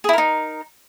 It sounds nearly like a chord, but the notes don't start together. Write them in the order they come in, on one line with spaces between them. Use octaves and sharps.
G#4 E4 A#4 D#4